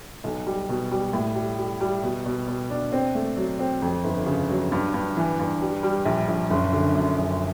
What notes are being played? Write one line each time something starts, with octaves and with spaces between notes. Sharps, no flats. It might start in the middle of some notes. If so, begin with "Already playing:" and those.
B1
G3
B2
G3
A2
G3
G3
G3
B2
B2
B2
D4
C4
A3
F#3
C4
F2
G1
C#3
F#3
G2
G2
E3
G2
G3
G3
A#1
A#1
F#1
D3
F#2
F#1